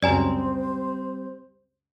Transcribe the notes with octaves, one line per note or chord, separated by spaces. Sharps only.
C#2 F#2 G3 C4 C5 D5 G#5 A#5